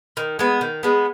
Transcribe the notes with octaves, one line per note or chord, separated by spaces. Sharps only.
D#3
G#3 B3
D#3
G#3 B3